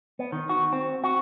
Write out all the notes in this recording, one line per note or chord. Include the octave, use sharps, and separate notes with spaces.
B3
D#3
F#4
C4
F#4